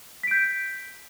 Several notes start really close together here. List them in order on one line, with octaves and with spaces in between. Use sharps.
B6 D7 G6